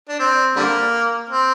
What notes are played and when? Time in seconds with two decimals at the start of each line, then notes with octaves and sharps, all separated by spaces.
0.09 D4
0.19 C4
0.56 D3 G3 A#3
1.30 C4